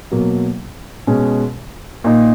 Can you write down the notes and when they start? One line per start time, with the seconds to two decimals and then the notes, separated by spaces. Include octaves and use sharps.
0.12 B2 F#3 A#3
1.07 B2 G#3 C#4
2.04 A#2 A#3 D#4